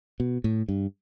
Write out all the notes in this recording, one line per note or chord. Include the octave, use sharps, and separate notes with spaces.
B2
A2
G2